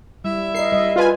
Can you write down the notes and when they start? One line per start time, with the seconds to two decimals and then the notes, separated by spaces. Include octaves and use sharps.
0.24 G3 E4 E5
0.55 A#4 D#5 C7
0.72 G3 D#5
0.96 F4 B4 G#5